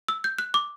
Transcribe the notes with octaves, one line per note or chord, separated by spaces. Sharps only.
E6
G6
F#6
D6